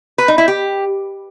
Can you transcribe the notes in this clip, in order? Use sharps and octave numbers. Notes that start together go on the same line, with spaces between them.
B4
D#4
E4
G4